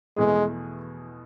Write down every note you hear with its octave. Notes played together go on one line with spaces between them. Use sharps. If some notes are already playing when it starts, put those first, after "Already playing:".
E2 B2 G#3 A3 E4 G#4